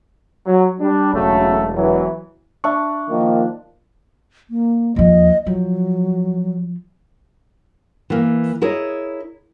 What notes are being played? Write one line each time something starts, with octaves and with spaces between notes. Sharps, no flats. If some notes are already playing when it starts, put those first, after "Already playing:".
F#3
G3 D4
E1 C#3 F#3 A3
E3 F#3
D4 E5 C#6
D#3 F3 A#3
A#3
D#2 F3 D#5
F3 F#3
E3 A#3
E4 G#4 A#4 C#5 D#5